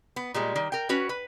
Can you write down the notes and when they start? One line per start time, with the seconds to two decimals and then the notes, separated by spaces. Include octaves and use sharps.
0.16 B3
0.34 A#2 G3 G#3
0.56 D#3 G3
0.72 A#4 G5
0.89 C#4 F#4 B4
1.09 B4